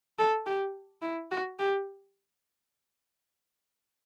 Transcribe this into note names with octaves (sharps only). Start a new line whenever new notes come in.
A4
G4
E4
F#4
G4